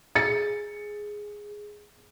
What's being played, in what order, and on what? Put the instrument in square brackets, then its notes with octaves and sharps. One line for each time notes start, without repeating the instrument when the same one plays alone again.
[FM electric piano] G#4 [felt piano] A6 C#7